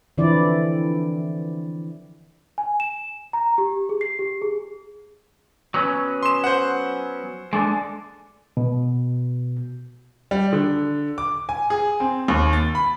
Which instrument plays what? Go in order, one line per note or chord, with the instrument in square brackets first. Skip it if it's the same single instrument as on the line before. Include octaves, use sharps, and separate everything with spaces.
[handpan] D3 E3 F3 C4 E4 D5
[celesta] G#5
E7
A#5
G4
G#4
C7
G4
G#4
[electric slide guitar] F#3 B3 C#4
[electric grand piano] C6 E7
C5 F#5
[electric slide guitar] G#3 D4 A4
[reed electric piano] B2
[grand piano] G3
D3
D6
G#5
G#4
C4
D#2
A6
B5